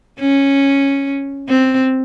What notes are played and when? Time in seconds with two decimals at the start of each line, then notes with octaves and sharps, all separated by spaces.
0.20 C#4
1.49 C4